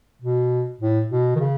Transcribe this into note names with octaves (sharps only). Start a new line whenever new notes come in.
B2
A2
B2
D#3
C#3